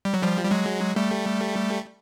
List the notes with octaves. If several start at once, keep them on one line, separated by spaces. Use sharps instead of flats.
G3
F#3
F3 G3
G3
F#3 G#3
G3 A3